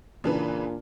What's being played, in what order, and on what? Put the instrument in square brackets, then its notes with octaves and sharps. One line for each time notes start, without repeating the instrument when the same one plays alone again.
[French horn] A#2 [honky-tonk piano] C#3 E3 B4 [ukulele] D4